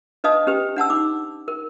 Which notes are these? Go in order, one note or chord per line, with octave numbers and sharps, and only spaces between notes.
D4 B4 D#5 F5 A5 D#6
C#4 G4 B4 G5
D4 F#5 A5 E6
D#4 D6
A#4